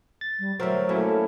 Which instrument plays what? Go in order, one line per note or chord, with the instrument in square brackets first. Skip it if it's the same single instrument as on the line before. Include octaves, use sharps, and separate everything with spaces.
[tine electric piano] A6
[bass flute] G3
[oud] D2 C4 [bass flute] F#3 [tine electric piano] F#4 A#4 E5
[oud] A3 [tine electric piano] A#3 C#4 E4